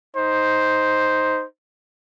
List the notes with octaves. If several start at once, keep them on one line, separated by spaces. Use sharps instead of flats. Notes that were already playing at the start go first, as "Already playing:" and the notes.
D#4 C5